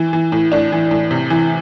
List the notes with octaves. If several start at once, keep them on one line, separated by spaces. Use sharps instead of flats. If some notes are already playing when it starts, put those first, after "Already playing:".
Already playing: E3
E3
A2
A2 D4
E3
A2
C3
E3